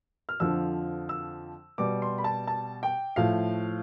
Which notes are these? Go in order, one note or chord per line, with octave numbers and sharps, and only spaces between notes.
F6
F2 D3 F3 E6
E6
B2 G3 D6
C6
B5
A5
A5
G5
A2 F3 F5